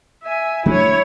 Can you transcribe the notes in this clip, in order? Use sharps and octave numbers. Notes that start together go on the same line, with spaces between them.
E5 G#5
F#3 A3 D4 E4 C#5